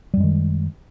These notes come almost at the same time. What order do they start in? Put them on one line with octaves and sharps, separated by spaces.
G3 F#2 G#3 D#3